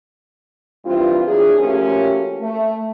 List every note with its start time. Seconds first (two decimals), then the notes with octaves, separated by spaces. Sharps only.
0.85 G2 E3 G3 C4 F4
1.26 E2 F#3 D4 G#4
1.59 F3 A3 A#3 C#4 F#4 G4
2.41 A3